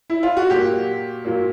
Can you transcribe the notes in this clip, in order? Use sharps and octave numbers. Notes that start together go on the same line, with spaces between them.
E4
F4
F#4
A#2 F#3 A#3 G4
A#2 F#3 A#3